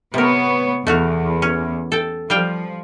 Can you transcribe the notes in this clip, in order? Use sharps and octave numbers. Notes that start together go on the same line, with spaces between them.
C3 B3 A#4 C#5
E2 A3 F#4 F5
C#4
A4 G5
F3 G3 F5 G5